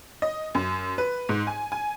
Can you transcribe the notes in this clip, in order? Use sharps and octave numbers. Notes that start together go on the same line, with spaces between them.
D#5
F#2
B4
G#2
G#5
G#5